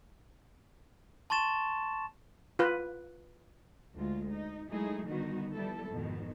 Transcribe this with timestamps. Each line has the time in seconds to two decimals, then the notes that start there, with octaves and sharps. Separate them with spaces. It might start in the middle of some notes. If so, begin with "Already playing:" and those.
1.30 A5 C6 C#6 A6 E7
2.59 F4 B4
3.95 D2 G#3 F4
4.30 D#4
4.68 F#3 G#3 A3 D#4 E4 G#4
5.06 D3 D#3 G3 B3 D#4 F#4
5.53 F3 G3 B3 E4 A4
5.89 F2 G#2 B2 D#3